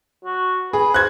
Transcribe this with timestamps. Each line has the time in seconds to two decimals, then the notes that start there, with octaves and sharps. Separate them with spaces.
0.25 F#4
0.73 G#4 B4
0.94 C5 F#6 G#6